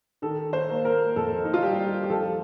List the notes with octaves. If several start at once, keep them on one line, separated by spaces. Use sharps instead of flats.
D#3 A4
C5
A#3
A#4
F2 A4
D#4
F4
G3 G4
G4
F3 A4